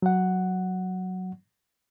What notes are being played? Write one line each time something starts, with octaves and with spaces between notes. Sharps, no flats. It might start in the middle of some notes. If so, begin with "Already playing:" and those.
F#3 F#5